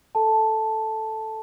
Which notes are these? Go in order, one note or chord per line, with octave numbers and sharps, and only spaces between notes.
A4 A5